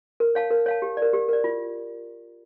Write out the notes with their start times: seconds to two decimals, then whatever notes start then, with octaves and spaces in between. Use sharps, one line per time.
0.20 A#4
0.35 C#5 F5 A5
0.51 A#4
0.66 C#5 F5 A5
0.82 G4
0.97 A#4 D5
1.13 G4
1.29 A#4 D5
1.44 F4